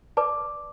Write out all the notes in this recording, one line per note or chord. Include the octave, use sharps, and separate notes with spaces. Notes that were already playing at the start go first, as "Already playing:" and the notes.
B4 D5 A5 D6